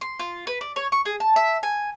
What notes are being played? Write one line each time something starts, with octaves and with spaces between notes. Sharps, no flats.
C6
F4
B4
D5
C#5
C#6
G#4
A5
E5
G#5